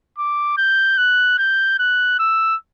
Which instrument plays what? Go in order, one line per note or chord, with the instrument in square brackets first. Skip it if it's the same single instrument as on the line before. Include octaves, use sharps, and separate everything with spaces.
[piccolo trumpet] D6
G6
F#6
G6
F#6
E6